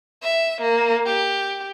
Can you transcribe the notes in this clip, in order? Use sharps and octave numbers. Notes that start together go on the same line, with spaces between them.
E5
A#3
G4